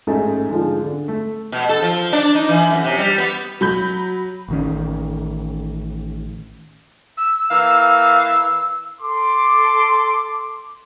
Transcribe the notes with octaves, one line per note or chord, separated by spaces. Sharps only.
A1 G#2 A3 D#4 A4
G#2 D3 F3 G#3
D3
A3
B2
A4
F3
D4
D#4
E3
F#2
C3
G3
B3
F#3 B5 G6
A1 D#3 C#4
E6
E3 A#3 F5
A4 C6 D6